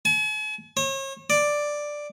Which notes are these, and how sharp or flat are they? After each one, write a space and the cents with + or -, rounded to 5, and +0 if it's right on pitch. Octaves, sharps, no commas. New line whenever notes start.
G#5 +45
C#5 -40
D5 +5